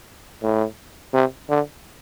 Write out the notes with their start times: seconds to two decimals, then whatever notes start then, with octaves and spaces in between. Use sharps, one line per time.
0.43 A2
1.14 C3
1.49 D3